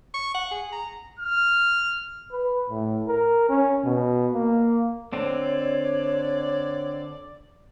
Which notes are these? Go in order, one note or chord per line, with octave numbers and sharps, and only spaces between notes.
C#6
F#5
G#4
A#5
F6
B4
A2
A#4
C#4
B2
A#3
D3 C4 C#5 D5